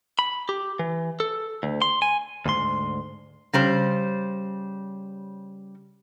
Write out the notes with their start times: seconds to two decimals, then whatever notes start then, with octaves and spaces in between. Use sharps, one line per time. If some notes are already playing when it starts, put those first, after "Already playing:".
0.19 B5
0.49 G4
0.79 E3
1.20 A4
1.63 D2
1.82 C6
2.02 G#5
2.46 D2 G#2 C6
3.53 C#3 G3 C5